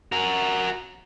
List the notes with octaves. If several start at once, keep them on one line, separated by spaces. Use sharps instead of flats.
F#4 A#4